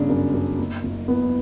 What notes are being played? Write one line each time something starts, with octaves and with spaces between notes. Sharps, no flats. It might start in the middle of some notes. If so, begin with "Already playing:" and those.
Already playing: G1 C#3 D4
F#2
F#2
F#1
F#1
E2 B3